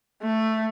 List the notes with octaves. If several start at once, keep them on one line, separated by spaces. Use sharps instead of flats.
A3